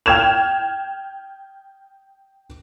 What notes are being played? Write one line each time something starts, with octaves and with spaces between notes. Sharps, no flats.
G5 F6 G#6 E7 F7